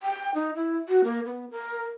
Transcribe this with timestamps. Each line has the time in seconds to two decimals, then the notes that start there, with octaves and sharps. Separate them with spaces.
0.03 G5
0.35 D#4
0.56 E4
0.88 F#4
1.04 A#3
1.26 B3
1.51 A#4